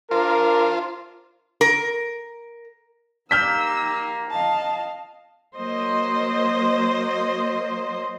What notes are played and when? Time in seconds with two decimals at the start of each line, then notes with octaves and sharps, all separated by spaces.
0.11 D4 F4 A#4 C5
1.61 A#4
3.31 A#3 D#4 G4 E6 F6 G6 B6
4.31 D#5 F5 A5
5.57 F#3 A#3 C5 D#5